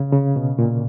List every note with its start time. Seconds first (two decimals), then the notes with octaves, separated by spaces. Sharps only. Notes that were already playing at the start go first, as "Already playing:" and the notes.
Already playing: C#3
0.12 C#3
0.36 B2
0.59 A#2